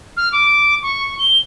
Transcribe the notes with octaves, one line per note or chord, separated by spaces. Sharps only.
F6
D6
C#6
G7